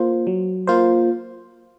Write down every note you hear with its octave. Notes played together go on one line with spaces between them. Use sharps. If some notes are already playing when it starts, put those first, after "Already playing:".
Already playing: A#3 F4 C5
F#3
A#3 F4 C5